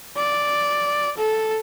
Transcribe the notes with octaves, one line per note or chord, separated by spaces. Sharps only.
D5
A4